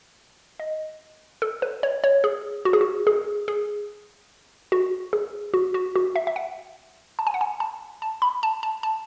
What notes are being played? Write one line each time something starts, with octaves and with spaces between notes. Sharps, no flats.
D#5
A4
B4
C#5
C#5
G#4
F#4
G#4
F#4
G#4
G#4
F#4
G#4
F#4
F#4
F#4
E5
E5
F#5
A5
G#5
F#5
G#5
A5
A5
B5
A5
A5
A5